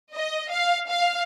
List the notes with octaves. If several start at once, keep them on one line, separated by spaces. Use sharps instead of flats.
D#5
F5
F5